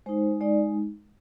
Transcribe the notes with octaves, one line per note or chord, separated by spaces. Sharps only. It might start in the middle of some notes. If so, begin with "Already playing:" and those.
G#3 D#4 C5
G#3 D#4 D5